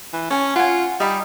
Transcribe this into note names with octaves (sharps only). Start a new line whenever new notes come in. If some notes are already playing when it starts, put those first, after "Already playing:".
E3
C#4 G#5 A5
F4 F#5 G#5
G3 D#4 B5